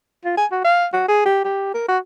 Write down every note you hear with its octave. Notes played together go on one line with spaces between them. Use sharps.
F4
G#5
F#4
F5
F#4
G#4
G4
G4
A#4
F#4